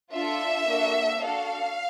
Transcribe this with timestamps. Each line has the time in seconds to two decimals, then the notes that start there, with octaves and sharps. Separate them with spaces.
0.13 D4 F4 A4 E5
0.67 A#3 D4 F#4 A4
1.19 D4 F#4 A4 F5